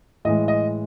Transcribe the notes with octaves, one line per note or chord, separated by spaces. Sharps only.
A2 E3 G#3 D#5
D#5